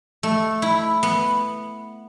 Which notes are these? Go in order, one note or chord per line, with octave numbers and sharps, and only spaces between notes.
A3
E4
B3